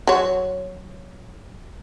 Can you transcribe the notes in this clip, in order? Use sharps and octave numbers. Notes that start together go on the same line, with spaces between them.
F#3 C#5